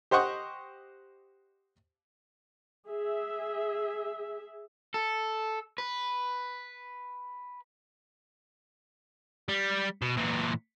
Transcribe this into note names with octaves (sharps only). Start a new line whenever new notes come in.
G4 C5 D#5 F#5 C#6 D#6
G#4 E5
A4
B4
G3
B2
A#2 E3